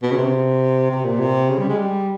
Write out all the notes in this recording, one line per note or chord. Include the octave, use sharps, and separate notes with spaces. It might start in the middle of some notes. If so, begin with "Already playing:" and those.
B2
C#3
C3
C3
A#2
C3
C#3
G3
G#3
G3